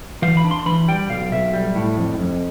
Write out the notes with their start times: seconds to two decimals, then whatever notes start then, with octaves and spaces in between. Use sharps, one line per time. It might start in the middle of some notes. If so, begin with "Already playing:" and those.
0.22 E3 F5
0.37 B5
0.44 D4
0.51 C6
0.66 E3 B5
0.88 G3 G5
1.10 B1 F5
1.32 B1 E5
1.54 G3
1.75 A2
1.97 F2
2.19 F2